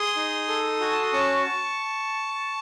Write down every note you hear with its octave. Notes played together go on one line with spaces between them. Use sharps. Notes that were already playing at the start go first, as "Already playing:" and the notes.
Already playing: G#4 C6 D#6
D#4
A4
F#4 G#5
A5
C6
C#4 A5 C#6